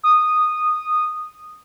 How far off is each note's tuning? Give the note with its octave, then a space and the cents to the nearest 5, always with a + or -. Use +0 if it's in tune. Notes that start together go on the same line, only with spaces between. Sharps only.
D#6 -10